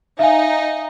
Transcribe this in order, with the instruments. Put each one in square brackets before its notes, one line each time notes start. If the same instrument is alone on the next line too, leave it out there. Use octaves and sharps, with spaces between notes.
[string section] D#4 [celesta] E5 F5 G#5